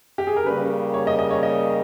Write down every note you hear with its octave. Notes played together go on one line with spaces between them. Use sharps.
G4
G#4
A#4
C#3 G3 A#3 B4
C#5
D#5
D#5
C#5
D#5